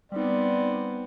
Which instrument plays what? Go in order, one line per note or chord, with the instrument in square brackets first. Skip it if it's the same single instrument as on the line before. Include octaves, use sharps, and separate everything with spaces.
[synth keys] G3 D#4 [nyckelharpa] B3 C4 [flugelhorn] D5